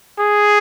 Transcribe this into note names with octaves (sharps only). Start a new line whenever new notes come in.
G#4